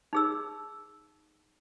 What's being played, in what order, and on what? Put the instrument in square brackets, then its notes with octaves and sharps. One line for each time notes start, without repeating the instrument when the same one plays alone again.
[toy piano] D#4 G#4 E6